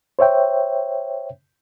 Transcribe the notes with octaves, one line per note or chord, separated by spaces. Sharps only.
C5 C#5 E5 G5